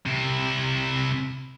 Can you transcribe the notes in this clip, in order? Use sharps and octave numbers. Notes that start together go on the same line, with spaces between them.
C3 E4